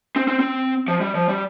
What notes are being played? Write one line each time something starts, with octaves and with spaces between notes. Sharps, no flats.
C4
C4
C4
F3
G3
F3
G3